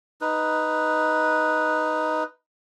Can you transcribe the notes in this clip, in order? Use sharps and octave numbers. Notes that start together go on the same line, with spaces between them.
D#4 B4